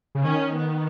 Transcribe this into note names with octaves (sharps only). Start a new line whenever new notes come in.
C#3
D#3 C#4
B3